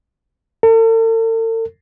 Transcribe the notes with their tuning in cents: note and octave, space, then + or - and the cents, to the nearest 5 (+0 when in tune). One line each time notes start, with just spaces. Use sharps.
A4 +45